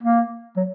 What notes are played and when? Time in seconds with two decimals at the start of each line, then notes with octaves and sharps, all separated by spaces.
0.03 A#3
0.57 F#3